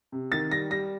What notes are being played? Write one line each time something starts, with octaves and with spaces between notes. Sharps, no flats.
C3
D#3 A6
G3 A#6
G3 A#6